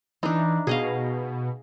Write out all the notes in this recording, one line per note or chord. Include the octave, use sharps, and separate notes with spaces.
E3 D4 D#4
B2 G#4 D#5 F5